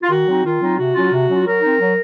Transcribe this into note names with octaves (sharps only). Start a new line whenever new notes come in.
F4
D#3 F#4
F#3 C4 D#4
D#3 F4
F#3 C4 D#4
C3 F#4
F#3 C#4 F4
C3
F#3 C#4 F4
F#3 A#4
C4 D#4
F#3